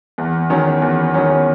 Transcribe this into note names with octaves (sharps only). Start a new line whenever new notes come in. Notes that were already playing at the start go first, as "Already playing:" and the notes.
E2
D#3 F#3 C#4
E2
D#3 F#3 C#4